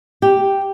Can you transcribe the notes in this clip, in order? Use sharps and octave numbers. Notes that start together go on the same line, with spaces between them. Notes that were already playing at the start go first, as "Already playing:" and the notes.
G4